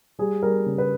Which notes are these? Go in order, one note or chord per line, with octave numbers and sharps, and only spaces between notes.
G3 G#4
G3 A#4
C#3
B4